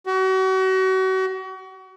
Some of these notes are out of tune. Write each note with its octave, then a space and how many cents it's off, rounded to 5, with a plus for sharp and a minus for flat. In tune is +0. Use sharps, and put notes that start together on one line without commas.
F#4 +35